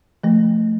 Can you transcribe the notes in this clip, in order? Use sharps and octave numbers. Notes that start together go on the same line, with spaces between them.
F3 A3